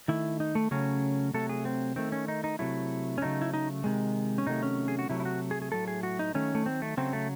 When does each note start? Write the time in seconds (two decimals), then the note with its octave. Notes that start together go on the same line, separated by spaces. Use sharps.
0.08 D#3 A3 E4
0.40 D#4
0.55 A3
0.71 C#3 F#3 A3 C#4
1.34 C3 F#3 A3 A4
1.49 G#4
1.65 C4
1.96 D#3 A3 C4
2.12 C#4
2.28 D#4
2.44 D#4
2.59 C3 F#3 A3 E4
3.18 C#4
3.22 C#3 F#3 A3 D#4
3.41 E4
3.54 D#4
3.84 C3 D#3 G#3
4.38 C#4
4.47 C3 D#3 F#3 A3 D#4
4.63 C#4
4.88 G#4
4.99 F#4
5.09 C3 F#3 A3 E4
5.20 E4
5.25 F#4
5.51 G#4
5.62 G#4
5.72 A2 F#3 A3 A4
5.88 G#4
6.03 F#4
6.19 D#4
6.34 D#3 F#3 A3 C#4
6.55 A3
6.66 C4
6.82 A3
6.97 C#3 F#3 A3 C4
7.13 A3